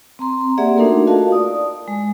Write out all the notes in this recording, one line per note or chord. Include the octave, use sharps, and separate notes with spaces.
C4 A#5 C6
A#3 G4 G#4 D5 E5 F#5
A3 D4 D#4 F#4 A4 A#4
F4 F#4 A#4 D#5 F5 A5
D5 D#6
G#3